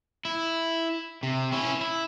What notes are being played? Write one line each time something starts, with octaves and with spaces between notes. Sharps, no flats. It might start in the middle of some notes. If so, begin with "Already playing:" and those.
E4
C3
C#4 E4
E4